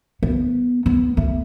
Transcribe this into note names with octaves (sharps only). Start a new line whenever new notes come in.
B3
B3
A3